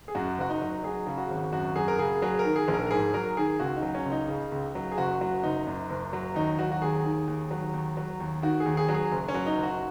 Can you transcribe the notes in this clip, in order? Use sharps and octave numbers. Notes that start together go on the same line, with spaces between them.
G#4
F#2 F#4
F#1 F#4
D#4
F#3
F#3 G#4
C#3
F#4
G#1
F#2 F#4
F#3 G#4
A#4
C#3 G#4
F#3 G#4
A#4
D#3
G#4
A#1
A#4
A#4
G#2 G#4
F#3 A#4
D#3 G#4
C#2 F#4
D#4
F#3
C#4
C#2
D#4
C#3
C#2
F#3
G#4
F#1 F#4
F#3 F#4
F#1 D#4
F#2
F#1
F#3
D#2 D#4
F#3 F#4
F#4
D#2 G#4
D#3
D#2
F#3
D#2
F#3
D#2
D#3 F#4
G#4
D#2
G#4
F#3
G#4
F#1
C#4
F#3
D#4
F#1
F#4